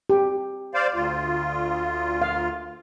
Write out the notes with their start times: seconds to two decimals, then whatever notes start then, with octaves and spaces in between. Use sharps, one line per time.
0.10 G4
0.74 C5 D5 F5
0.94 D2 F4
2.22 F5